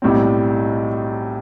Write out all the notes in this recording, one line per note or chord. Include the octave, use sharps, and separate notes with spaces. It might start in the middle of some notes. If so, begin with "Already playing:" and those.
B1 A2 G3 C4